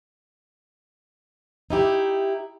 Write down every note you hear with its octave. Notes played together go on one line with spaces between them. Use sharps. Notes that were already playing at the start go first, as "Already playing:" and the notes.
D#4 E4 G4